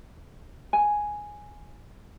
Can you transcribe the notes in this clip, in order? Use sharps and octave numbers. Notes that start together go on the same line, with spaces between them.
G#5